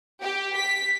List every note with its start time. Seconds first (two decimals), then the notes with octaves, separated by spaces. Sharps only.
0.22 G4
0.56 B6